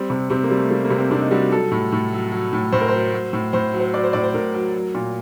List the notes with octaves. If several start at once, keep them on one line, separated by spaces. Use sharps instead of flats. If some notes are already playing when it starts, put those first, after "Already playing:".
Already playing: G3 C4
C3
C3 C4
A#3
G3
A3
G3 A#3
A#3
C3
C4
C3 D4
D#4
G3 F#4
F#3 A4
A2
A2
F#3
F#3
A2
A2 C5
A#4
F#3 C5
F#3
A2
A2 C5
F#3
C5
F#3 D5
C5
A2 D5
C5
A2 A#4
F#3
F#3
A#2